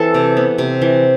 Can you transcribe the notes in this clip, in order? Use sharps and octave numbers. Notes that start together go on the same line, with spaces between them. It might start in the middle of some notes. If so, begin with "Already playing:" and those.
Already playing: E3 C4 A4
C3
B3
C3
E3